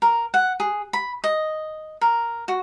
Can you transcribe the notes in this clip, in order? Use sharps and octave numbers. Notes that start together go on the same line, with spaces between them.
A#4
F#5
G#4
B5
D#5
A#4
F#4